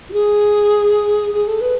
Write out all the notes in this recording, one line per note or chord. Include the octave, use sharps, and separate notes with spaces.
F#4
G#4
G#4
A4
B4